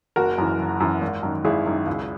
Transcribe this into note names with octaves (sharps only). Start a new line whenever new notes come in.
F#1 F#4 A#4
F#2 E3
F#1
F#2 E3
G#1
F#2 D#3
G#1 E4 G#4
F#2 D#3
C#2